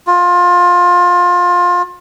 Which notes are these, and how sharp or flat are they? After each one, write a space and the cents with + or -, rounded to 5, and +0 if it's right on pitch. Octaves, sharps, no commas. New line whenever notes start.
F4 +20